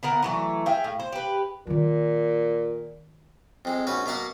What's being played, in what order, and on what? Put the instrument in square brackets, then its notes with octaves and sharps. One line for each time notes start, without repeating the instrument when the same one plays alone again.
[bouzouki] D3 B3 A#4 F#5
E3 F#3 A3
G#4 E5 F5 G5
A2
C5
G4 B4
[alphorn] A#2 [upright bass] D#3 F4
[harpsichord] F2 G#3
A#1 C#4 F#4 B4
B2 A#3 F5 F#5